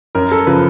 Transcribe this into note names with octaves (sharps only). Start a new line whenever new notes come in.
F#2 A#4
A4
C#3 F3 B4